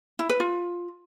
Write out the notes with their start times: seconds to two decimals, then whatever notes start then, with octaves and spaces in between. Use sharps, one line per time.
0.19 E4
0.29 B4
0.40 F4